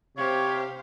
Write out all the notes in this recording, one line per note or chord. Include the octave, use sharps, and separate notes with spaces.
C3 G4 C5 C#5 F5